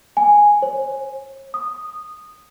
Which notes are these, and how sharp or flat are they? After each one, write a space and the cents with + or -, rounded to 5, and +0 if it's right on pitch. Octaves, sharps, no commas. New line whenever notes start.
G#5 -5
C#5 -45
D#6 -15